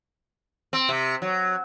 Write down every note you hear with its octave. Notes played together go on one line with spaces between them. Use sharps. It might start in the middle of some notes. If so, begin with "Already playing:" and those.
C4
C3
F#3